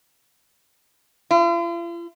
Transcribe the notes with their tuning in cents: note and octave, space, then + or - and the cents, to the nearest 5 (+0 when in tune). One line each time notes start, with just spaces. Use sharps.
F4 -45